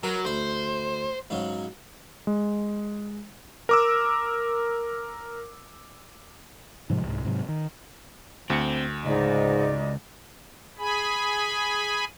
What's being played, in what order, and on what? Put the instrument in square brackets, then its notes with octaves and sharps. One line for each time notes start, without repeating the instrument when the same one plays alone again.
[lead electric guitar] F#3 [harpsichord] A#4 B4
[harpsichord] D2 B5 [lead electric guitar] C5
[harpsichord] G#2 C#3 F#3
[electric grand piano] G#3
A#4 D6 E6
[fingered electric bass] G#2 C3 F3 G#3
C2 G#2
G#2 C3 F#3
D#3
[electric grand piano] D2 C#7 [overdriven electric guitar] C4
[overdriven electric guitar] C#2 [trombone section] G#2 [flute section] D#4 D5 D#5
[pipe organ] G#4 G#5 B5